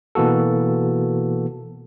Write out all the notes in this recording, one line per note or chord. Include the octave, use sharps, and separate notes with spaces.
B2 E3 A#3 F#4 A4